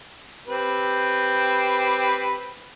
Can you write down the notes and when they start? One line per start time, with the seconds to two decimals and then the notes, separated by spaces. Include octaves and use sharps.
0.48 C4 G4 B4